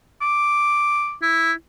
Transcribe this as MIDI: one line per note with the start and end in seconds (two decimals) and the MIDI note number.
0.22 1.15 86
1.22 1.52 64